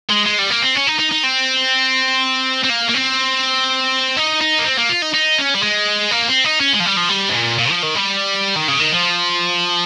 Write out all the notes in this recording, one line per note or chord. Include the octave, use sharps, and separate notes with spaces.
G#3
G#3
G3
A#3
C4
C#4
D#4
D#4
D#4
C4
C4
A#3
A#3
C4
D#4
D#4
A#3
C4
A#3
F4
D#4
D#4
C#4
G3
G#3
A#3
C4
D#4
C#4
G#3
F3
G3
F3
G3
G#2
A#2
A#2
F3
D#3
G3
D#3
C#3
D#3
F3